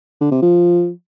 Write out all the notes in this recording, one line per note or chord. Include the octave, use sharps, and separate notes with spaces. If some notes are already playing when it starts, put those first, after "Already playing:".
D3
C3
F3